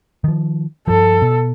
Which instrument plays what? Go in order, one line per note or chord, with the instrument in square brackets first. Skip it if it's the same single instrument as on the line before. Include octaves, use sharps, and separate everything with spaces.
[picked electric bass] D#3 F3
[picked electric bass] G2 F3 [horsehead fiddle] A4
[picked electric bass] B2